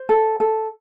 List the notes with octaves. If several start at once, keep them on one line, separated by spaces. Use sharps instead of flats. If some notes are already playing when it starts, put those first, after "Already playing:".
Already playing: C5
A4
A4